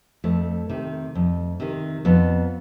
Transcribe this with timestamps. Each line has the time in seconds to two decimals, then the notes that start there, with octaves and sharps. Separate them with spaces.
0.24 F2 A3
0.70 C3 D#3
1.15 F2
1.60 C3 D#3
2.05 F2 B3